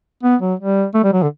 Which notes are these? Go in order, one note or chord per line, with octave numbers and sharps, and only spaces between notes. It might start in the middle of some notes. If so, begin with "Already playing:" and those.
B3
F#3
G3
A3
G3
F#3
D3